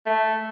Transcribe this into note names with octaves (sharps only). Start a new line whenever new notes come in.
A3